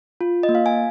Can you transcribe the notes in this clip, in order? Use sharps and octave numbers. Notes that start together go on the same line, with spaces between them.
F4
D#5
A#3
F5
G#5